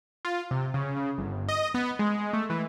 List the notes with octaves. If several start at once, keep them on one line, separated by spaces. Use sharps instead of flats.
F4
C3
C#3
C#3
G1
D#5
B3
G#3
A3
E3